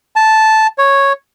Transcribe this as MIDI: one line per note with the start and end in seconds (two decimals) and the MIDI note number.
0.16 0.67 81
0.78 1.13 73